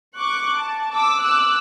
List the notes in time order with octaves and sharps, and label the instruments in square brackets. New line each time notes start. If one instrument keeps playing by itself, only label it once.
[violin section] C#6 D6 F#6
A5
D6 E6
D6 E6 F#6